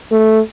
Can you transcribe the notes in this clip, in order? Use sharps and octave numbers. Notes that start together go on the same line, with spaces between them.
A3